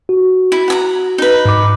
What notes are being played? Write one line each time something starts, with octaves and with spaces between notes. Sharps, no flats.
F#4
E4
F#5 G#5 A#5
D#4 B4
G#2 D6